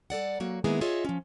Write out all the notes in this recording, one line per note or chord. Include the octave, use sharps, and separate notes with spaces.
G3 A4 D5 F#5
F#3 A#3 F#4
D#3 G#3 A#3 B3 E4 G#4
F4 G#4 C#5 D#5 E5
F3 C#4